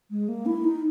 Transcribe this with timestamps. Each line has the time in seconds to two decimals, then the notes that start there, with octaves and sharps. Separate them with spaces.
0.11 G#3
0.29 A#3
0.46 E4
0.64 D#4